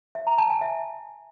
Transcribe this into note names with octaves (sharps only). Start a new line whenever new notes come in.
E5
A#5
A5
G#5
E5